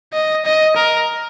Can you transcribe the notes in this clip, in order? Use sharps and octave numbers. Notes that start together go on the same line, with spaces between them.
D#5
D#5
A#4